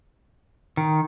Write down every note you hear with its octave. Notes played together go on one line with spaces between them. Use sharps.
D#3